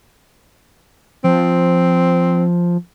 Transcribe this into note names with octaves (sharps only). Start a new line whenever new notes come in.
F3 C4